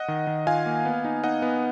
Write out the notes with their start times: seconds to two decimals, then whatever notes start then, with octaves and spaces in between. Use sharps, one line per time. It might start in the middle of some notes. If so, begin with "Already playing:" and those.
Already playing: D#5 F#5
0.08 D#3
0.27 D#3
0.47 F4 F5 G#5
0.66 A#3
0.85 B3
1.05 D#4
1.24 D#4 D#5 F#5
1.42 B3